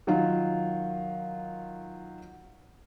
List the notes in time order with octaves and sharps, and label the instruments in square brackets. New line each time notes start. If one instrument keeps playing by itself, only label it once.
[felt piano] D#3 F#3 F4